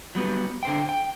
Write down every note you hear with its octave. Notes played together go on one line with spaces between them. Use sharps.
F#3 G3 B3
D3 C5 G5
G5